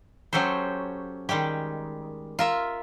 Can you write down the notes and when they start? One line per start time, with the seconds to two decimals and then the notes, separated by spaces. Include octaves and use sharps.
0.33 F#3 C#4 G4 A4 C5
1.29 D#3 G3 G#3 G4
2.39 F4 A#4 E5